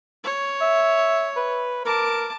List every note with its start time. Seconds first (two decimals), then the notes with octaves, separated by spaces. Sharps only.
0.24 C#5
0.61 E5
1.36 B4
1.85 A#4 A5 D6